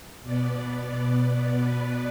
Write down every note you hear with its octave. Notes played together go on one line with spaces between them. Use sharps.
B2 B3 D5
B4